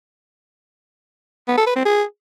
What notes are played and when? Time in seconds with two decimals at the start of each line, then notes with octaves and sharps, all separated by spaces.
1.48 B3
1.57 A4
1.67 B4
1.76 C4
1.85 G#4